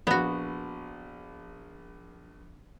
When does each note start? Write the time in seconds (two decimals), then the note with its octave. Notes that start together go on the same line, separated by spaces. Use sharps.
0.07 A#1 B3 F#4